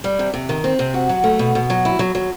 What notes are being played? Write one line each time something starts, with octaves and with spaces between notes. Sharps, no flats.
G3
C3
C3
D#3
C4
C3
F#4
F#3
A3
B2
B2
F#3
E4
F#3
F#3